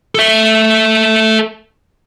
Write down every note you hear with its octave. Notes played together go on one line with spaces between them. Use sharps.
A4 E5